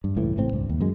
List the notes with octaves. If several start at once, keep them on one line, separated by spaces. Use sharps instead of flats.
G2
C#2 A2 E3
A1 A2 C4
C#2 G2
D#2
F#2 G#3